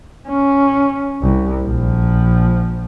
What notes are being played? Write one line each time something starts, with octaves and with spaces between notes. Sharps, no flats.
C#4
C2
A#1 F3